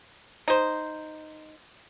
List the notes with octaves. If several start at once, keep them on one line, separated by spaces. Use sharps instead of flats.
D#4 C5